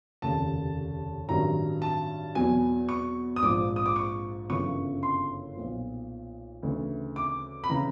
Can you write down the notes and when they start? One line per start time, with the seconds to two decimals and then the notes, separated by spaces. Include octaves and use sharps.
0.22 F1 D#2 C#3 A5
1.28 A1 G2 D#3 F#3 A#5
1.82 A5
2.35 E2 B2 F#3 G#5
2.89 C#6
3.36 D#6
3.42 A#1 G#2 F3 D6
3.76 D#6
3.86 D6
3.96 C#6
4.49 G1 F#2 C#3 E3 C#6
5.03 C6
5.56 B1 A#2 F3
6.63 D2 C#3 E3
7.16 D6
7.64 B5
7.70 C#3 E3 A#5